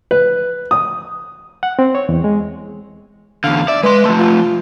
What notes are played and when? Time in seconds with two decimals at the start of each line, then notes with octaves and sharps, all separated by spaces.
0.11 B4
0.71 D#6
1.63 F#5
1.79 C4
1.95 C#5
2.09 E2
2.24 G#3
3.44 E2 D3 F5
3.68 D5 E5
3.83 G#3 B4 C6
4.05 F3 A3
4.20 F4